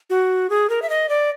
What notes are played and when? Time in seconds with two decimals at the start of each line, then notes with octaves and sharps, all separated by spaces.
0.10 F#4
0.50 G#4
0.70 A#4
0.82 E5
0.90 D#5
1.09 D5